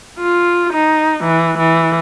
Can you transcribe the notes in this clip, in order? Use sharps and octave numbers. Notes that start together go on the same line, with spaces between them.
F4
D#4
E3
E3